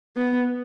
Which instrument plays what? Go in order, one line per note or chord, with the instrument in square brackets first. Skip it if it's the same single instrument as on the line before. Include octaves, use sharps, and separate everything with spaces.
[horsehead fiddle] B3